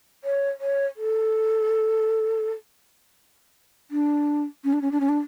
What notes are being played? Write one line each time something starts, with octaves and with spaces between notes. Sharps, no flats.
C#5
C#5
A4
D4
C#4
D4
C#4
D4
C#4
D4